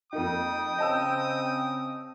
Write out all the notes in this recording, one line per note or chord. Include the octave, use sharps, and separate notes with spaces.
F2 A#3 D#4 G5 D#6
C#3 C4 D#5 A5 E6